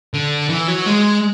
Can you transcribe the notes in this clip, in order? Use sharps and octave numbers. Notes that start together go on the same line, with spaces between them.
D3
E3
F#3
G#3